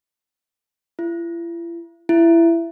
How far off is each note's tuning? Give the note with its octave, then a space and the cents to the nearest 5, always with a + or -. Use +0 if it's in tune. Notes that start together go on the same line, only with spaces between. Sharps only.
E4 +40
E4 +20